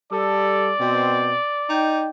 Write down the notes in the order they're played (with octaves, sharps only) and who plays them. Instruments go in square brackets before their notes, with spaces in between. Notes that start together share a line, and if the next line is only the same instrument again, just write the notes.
[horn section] G3 A4 [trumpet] D5
[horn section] B2 C4
D#4 G5